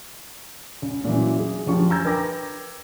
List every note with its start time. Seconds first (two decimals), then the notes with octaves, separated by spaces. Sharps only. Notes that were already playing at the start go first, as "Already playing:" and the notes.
0.82 C#2
1.04 A#2 C#3 E3 F#3
1.39 G#4
1.66 F#1 D2 F3 G4 C#6
1.90 G#5 A#5 E6 G6 G#6
2.05 A#4 B4 G5 D6 A#6